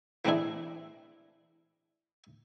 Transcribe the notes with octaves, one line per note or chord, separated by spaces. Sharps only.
E3 A3 C4 D4 E4 G#4